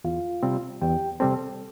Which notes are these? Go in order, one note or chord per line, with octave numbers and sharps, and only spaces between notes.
E2 F4 F5
C3 G3 C4
E2 G4 G5
C3 G3 C4 A4 A5